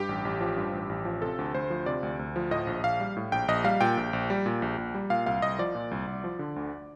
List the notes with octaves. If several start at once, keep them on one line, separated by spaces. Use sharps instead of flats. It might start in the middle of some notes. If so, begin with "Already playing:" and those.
Already playing: G2 G4
A1
A1
F3
G2
A1
A1
F3
C3 A4
D2
D2 C5
F3
C3 D5
D2
D2
F3
A2 D#5
A#1
A#1 F5
G3
A2
A#1 G5
A#1 D#5
G3 F5
A#2 G5
A#1
A#1
G3
A#2
A#1
A#1
G3
A#2 F5
C2 F5
C2 D#5
F3 D5
A#2
C2
C2
F3
D3
D2